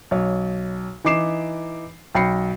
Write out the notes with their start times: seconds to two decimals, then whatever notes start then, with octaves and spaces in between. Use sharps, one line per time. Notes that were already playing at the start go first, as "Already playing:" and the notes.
0.11 B1 C#5
1.05 E3 D#4 D6 C7 E7
2.15 B1 G5 B5 A#6 C7 C#7